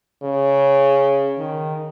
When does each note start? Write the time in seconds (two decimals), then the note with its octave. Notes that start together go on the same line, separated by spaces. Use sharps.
0.23 C#3
1.39 D#3